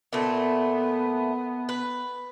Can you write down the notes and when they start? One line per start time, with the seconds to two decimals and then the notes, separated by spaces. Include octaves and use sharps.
0.13 A#2 A3 B3
1.69 B4